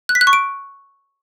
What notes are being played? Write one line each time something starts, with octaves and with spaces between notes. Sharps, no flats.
F#6
B6
F#6
C#6
D7